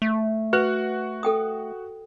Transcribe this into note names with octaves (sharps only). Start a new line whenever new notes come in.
A3
F#4 B4 F#5 F#6
A4 G5 D#6